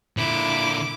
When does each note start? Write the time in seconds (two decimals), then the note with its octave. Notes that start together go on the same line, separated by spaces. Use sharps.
0.17 A#2 D3 E4 D6